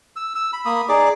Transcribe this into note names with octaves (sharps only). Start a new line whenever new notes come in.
E6
E6
B5
A#3 B5 D#6
D#4 G#4 D5 D6